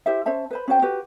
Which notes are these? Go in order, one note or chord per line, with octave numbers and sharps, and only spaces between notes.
E4 G4 C5 E5
C#4 C5 E5 A5
B4 C5 B5
C#4 F#4 C5 G5
F#4 G4 B4